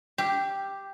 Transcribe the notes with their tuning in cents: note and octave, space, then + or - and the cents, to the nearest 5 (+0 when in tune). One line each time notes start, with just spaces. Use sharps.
G4 +0 F5 -40